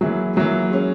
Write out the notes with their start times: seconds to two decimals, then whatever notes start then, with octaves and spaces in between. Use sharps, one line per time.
0.01 E3 F#3 A#3 E4 G#4
0.36 E3 F#3 A#3 E4 G#4
0.71 G#3 C#4 G#4